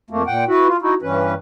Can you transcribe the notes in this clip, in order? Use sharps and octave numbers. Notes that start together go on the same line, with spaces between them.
F2 A3 A#3
A#2 F#5 G5
E4 F#4 B4
F4
D#4 E4 F#4
G2 E3 C#4 B4